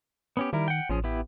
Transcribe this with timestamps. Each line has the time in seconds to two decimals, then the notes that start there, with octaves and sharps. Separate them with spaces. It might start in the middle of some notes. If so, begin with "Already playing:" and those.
0.37 B3 C#4 G4
0.53 D#3 G3 E4 A#4
0.68 F#5 G5
0.90 A1 F3 C#4 G#4
1.04 B3 E4 G4